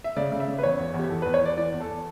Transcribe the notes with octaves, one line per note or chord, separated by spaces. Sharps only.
E5
C#3 D5
C#3
E5
C#3
B4
E2 C#5
E2
E2
G4
E2 A4
E2 B4
C#5
E2 D5
E3 D5
E2
A4